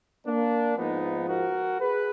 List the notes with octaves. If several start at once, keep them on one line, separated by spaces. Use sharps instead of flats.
A#3 D4
G#2 F3 B3 D#4
F#4 A#4
G#4 B4